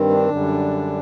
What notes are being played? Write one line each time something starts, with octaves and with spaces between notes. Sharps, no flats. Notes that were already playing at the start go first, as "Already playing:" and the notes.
Already playing: G2 D#3 G3 C4
D4
F#2 D3 G3